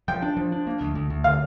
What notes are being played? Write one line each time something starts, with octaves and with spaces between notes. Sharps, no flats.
F3 G5
D4
F3
D4
A#3
D2
D2
D2
D3 F5